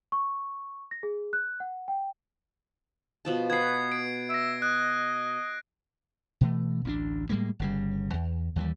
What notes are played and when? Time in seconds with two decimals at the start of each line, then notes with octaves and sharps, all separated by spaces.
0.12 C#6
0.91 A#6
1.03 G#4
1.33 F#6
1.60 F#5
1.88 G5
3.25 B2 F3 A5
3.50 B3 F#4 B4 G#6 C7
3.92 D7
4.30 E5 A#6 D7
4.62 D#5 F#6
6.41 B2 E3 A3
6.85 A1 D2 B3 D4
7.30 A2 G3 G#3 A#3
7.59 G1 C#3 G3
8.14 E2
8.56 D#2 E3 F3 G3